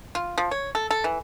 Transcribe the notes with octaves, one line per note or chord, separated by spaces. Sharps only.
F4
F3
C#5
A4
A4
E3